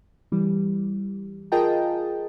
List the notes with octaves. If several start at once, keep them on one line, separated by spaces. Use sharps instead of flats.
E3 G3
F4 G#4 A#4 D#5 G5 A5